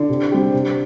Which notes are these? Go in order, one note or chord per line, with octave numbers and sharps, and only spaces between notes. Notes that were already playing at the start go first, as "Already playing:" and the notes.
Already playing: D3
C3
G3 C4 G4
C3